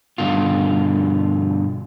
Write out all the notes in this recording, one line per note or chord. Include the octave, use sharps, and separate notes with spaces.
G2 B2 D3 F4